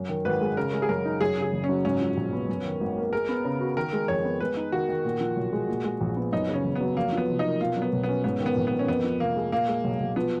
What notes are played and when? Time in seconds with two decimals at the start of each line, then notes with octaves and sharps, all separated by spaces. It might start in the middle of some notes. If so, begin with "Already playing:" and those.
Already playing: F#2
0.09 D#3
0.25 G#1 B4
0.41 G#3
0.57 C#3 A#4
0.73 G#3
0.82 G#4
0.89 F#2 A#4
1.05 D#4
1.21 F#2 G#4
1.37 C#3
1.42 G#4
1.53 F#1
1.64 C#4
1.69 F#3
1.85 G#2 C#4
2.01 F3
2.17 A#1
2.33 B3
2.49 F#2
2.65 D#3
2.81 G#1
2.97 A#3
3.13 G#3 A#4
3.29 B3
3.45 C#3
3.60 F#4
3.77 D#3 A#4
3.93 G#3
4.08 F2 C#5
4.25 B3
4.40 G#3 B4
4.57 D#4
4.72 D#3 F#4
4.89 D#3
5.05 A#2
5.21 F3
5.36 B1
5.53 G#3
5.69 A#2
5.84 G#3
6.01 A#1
6.16 B3
6.32 F#2 D#4
6.49 C#3
6.54 C#4
6.65 F#1
6.76 F#3 B3
6.96 F2 A#3
7.12 F3 B3
7.28 F1
7.39 D#4
7.44 A#3
7.61 B2 F4
7.77 F#3
7.82 B3
7.93 B1
8.03 B3
8.09 C#4
8.24 G#2 B3
8.40 D#3
8.46 B3
8.56 A#1
8.67 B3
8.72 A#3
8.79 C#4
8.88 F2 B3
9.04 F3
9.20 F1 A#3
9.36 G#3
9.52 A#2 A#3
9.68 G#3
9.84 B1
10.00 B1
10.16 F3 B3